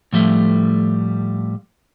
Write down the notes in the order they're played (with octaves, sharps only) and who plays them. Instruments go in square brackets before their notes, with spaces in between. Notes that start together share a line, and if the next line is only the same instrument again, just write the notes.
[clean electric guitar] A2 F3 G3 A3